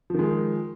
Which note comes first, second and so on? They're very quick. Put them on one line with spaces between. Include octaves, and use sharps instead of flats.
F3 D#3 G#3